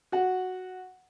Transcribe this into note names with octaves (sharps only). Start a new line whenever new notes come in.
F#4 F#5